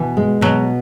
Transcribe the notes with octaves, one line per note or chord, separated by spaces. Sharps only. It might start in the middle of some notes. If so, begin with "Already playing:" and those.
Already playing: B2 E3
G#3
B2 F#3